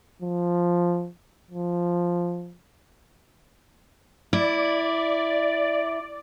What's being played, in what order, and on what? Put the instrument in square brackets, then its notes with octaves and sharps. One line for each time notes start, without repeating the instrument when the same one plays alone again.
[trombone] F3
F3
[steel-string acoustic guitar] E4 [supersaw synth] D5